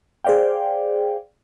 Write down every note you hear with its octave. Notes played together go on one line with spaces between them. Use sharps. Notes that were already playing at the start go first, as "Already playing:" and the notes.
G#4 C5 D5 F5 G5